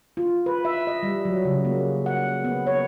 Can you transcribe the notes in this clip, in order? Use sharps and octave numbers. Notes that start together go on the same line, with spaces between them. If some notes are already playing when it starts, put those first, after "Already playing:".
F4
B4
E5
D#5
G3
F#3
C#3
A#3
F#5
B3
C#5